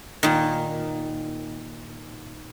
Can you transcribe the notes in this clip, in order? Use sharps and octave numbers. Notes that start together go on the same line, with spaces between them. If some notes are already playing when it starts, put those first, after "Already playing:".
A#2 D#3